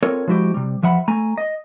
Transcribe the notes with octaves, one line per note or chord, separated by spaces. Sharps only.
C4 F4 A4 A#4 C#5
F3 G#3 E4 F#4 G4
C3 G3
E2 F3 E5 F#5 B5
A3 G#5 A#5
D#5